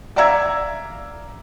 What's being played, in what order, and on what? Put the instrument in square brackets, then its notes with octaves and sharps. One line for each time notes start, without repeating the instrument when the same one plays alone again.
[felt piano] D5 E5 F5 A#5 E6 G#6